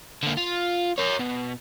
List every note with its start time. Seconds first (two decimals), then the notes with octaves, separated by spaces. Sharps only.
0.23 D3 A#3
0.37 F4
0.98 A#4 C#5
1.19 B2